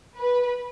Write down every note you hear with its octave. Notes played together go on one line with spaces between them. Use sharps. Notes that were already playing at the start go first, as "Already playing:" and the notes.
B4